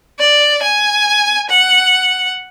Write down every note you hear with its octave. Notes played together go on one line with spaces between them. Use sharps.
D5
G#5
F#5